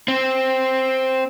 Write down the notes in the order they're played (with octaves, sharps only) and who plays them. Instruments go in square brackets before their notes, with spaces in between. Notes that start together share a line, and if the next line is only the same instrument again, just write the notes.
[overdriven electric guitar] C4